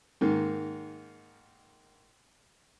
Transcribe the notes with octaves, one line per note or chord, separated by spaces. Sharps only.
G#2 D#3 A#3